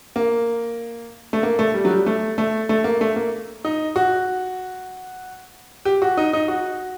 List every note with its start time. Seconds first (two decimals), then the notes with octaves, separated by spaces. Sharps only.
0.16 A#3
1.33 A3
1.43 A#3
1.59 A3
1.74 G3
1.85 F#3
1.91 G3
2.06 A3
2.38 A3
2.69 A3
2.84 A#3
3.01 A3
3.16 A#3
3.65 D#4
3.96 F#4
5.85 G4
6.02 F#4
6.17 D#4
6.33 D#4
6.48 F#4